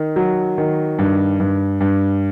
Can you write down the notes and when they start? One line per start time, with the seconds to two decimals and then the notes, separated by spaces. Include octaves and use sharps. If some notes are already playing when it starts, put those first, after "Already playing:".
Already playing: D#3
0.16 F#3
0.58 D#3
0.99 G2
1.40 G2
1.81 G2